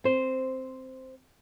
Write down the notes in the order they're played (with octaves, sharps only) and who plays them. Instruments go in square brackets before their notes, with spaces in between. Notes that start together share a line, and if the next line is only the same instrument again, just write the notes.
[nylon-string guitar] C4 C5